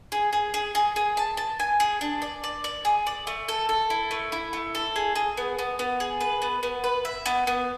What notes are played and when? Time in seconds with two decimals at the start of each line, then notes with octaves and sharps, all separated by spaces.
0.12 G#4
0.33 G#4
0.54 G#4
0.75 G#4
0.96 G#4
1.17 A5
1.37 A5
1.60 G#5
1.80 G#4
2.01 D4
2.22 D5
2.44 D5
2.64 D5
2.85 G#4
3.07 D5
3.27 A3
3.48 A4
3.69 A4
3.90 E4
4.11 A3
4.32 E4
4.53 A3
4.75 A4
4.96 G#4
5.15 G#4
5.37 B3
5.59 B3
5.79 B3
6.00 G#4
6.21 B4
6.42 B3
6.63 B3
6.84 B4
7.05 E5
7.26 B3
7.47 B3